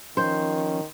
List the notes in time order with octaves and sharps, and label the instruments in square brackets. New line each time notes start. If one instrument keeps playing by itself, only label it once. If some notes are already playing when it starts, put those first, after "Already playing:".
[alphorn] D#3 [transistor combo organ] F3 C#4 [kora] C5